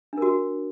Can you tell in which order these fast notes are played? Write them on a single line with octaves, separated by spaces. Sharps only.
D4 A#4 F#4